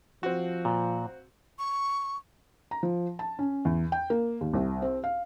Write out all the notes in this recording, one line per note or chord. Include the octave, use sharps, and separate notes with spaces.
F3 C4 F#4
A#2
C#6
A#5
F3
A5
C#4
E2
G5
A#3
D#2
C2
C4
F5